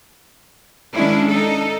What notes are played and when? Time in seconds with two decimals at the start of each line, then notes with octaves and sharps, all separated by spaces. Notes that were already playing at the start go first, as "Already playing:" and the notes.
0.93 D#3 G#3 C#4 D4 E4
1.27 D#4 A4